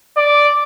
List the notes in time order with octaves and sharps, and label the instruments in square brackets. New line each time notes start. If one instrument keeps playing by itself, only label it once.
[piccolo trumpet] D5